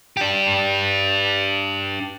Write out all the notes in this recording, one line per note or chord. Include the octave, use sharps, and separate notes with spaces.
D4 G4